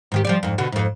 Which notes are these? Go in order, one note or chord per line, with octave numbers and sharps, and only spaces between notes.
G#2 D#3 G4
F3 G3 D5
F2 G#2
B2 D3 F#4
F2 G#2